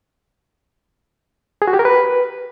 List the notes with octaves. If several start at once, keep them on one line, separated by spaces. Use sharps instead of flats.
G#4
F#4
G4
A#4
B4